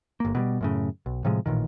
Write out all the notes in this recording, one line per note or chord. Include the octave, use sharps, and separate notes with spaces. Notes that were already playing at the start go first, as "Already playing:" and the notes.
G1 A#3
B2 F#3 G3
F#2 A2 C#3
B1
A2 C3 F3 G#3
A1 A#2 D#3